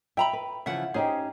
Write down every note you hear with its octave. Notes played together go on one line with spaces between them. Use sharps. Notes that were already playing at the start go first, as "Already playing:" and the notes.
E5 G5 A#5 B5
B4
C#3 E3 F3 E5 F#5
C#4 D#4 G4 G#4 C5